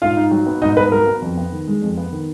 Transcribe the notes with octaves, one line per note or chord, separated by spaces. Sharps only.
G#2 F4 F5
D#4
F#3
B3
G#2 D#4 D#5
D#4 B4
F#3 A#4
B3
F2
B3
D#3
G#3
F2
B3
D#3